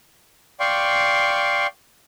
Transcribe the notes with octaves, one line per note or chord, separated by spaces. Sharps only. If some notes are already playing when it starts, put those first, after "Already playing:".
D5 F5 G5 C6 C#6